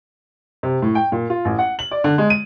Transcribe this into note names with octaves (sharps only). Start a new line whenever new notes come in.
C3
A2
G5
A#2
F4
A1
F#5
F#7
D5
D3
G#3
D#7